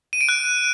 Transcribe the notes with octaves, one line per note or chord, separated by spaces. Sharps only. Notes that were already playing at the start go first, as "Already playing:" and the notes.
D#7
D7
F#6